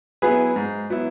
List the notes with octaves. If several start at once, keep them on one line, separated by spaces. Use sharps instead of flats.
F#3 B3 E4 G#4 B4
G#2
F#3 B3 E4